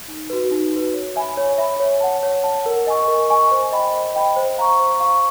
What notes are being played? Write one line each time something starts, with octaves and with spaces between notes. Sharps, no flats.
D#4
F#4 B4
D#4
F#4 B4
C#5
E5 G#5 B5
C#5
E5 G#5 B5
C#5
F#5 A5
C#5
F#5 A5
A#4
D#5 G#5 C#6
A#4
D#5 G#5 C#6
C5
D#5 G5 B5
C5
D#5 G5 B5
C5
F5 A#5 C#6
C5
F5 A#5 C#6